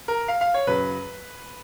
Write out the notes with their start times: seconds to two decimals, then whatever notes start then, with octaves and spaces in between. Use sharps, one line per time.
0.08 A#4
0.28 F5
0.41 F5
0.54 C#5
0.67 F#2 C#3 F#3 B4